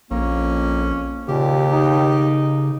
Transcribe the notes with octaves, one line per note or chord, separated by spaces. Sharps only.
A#1 F2 A#3 C#4
D#2 A#2 C#3 G4
D#4